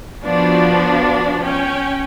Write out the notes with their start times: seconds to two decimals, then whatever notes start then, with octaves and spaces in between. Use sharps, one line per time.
0.25 F3 B3 D4 F#4
1.42 C#4 G5